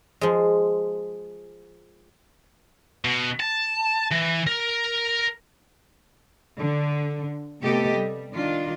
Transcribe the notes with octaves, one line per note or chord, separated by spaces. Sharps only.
F3 G#3
B2
A5
E3
A#4
D3
C3 A3 B3 G4 A4 D#5
G3
D#3 D4 F4